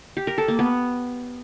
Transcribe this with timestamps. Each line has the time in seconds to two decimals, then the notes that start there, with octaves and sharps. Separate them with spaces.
0.17 G4
0.27 A#4
0.38 A4
0.48 A#3
0.59 B3